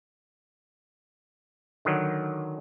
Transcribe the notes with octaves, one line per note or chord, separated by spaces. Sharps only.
D3 D#3 F#3